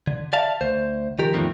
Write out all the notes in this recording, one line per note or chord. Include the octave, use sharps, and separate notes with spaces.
D3
D5 E5 F5 A5
D2 C5
D#3 F3 G4 A#4
E2 A2 D3 D#3 F3 C4